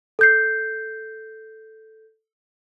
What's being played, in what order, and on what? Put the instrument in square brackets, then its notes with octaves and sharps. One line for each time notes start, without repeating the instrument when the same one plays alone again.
[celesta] A4 G6 C7